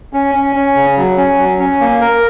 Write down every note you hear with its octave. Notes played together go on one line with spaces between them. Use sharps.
C#4
C#4
C#4
C#3
F#3
C#4
F#3
C#4
A#3
A#4